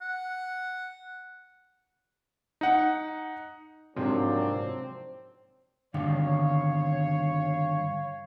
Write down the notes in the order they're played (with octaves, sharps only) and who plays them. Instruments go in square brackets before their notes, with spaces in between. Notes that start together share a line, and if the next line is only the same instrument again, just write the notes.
[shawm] F#5
[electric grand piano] D#4 F#5
[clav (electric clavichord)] G#2 C3 F3 [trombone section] F#3 A#3 D4 [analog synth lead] C4
[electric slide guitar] G2 D#3 [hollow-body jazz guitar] D3 [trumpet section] C#5 [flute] F5